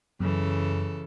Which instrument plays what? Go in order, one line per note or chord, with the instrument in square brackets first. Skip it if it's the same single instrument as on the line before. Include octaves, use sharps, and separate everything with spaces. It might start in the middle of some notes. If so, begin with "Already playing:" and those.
[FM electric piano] F#2 [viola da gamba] C#3 E3 A4